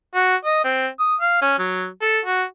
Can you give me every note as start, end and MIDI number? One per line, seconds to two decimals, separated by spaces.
0.15 0.35 66
0.45 0.61 75
0.65 0.87 60
0.99 1.15 87
1.21 1.38 77
1.42 1.54 61
1.59 1.87 54
2.01 2.19 69
2.25 2.43 66